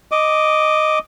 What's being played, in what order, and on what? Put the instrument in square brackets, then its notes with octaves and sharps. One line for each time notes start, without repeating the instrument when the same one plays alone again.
[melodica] D#5 D6